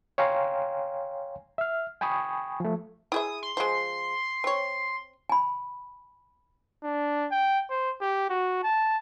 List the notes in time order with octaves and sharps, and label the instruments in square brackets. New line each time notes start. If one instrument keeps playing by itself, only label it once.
[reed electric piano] C#5 F5 G5 G#5 A#5 C6
E5 F6
G5 G#5 B5 C#6 D#6
F3 A3
[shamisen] E4 G#4 E5 [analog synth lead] D#6
[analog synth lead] C6
[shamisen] F3 G#3
C4 C#5
[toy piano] G#5 B5
[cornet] D4
G5
C5
G4
F#4
A5